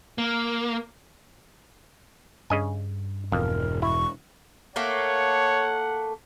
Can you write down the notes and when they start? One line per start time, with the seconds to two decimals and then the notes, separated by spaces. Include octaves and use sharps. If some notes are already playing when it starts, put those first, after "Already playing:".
0.18 A#3
2.50 G2 C#3 D#5 G#5
3.32 E1 F2 A#4
3.82 E4 C#6
4.76 A3 A#3 A4 C#5 F#5